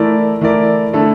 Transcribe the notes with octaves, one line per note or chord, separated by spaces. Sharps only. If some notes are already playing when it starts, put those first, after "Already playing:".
Already playing: E3 A3 E4 A#4 D5
E3 A3 E4 A#4 D5
D3 A3 E4 A4